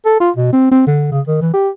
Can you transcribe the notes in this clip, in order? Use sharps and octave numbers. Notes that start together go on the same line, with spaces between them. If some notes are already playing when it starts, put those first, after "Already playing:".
A4
F4
B2
C4
C4
D3
C#3
D#3
E3
G4